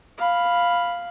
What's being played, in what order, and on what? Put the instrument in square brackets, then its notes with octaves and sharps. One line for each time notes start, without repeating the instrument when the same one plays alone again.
[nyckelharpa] F5 B5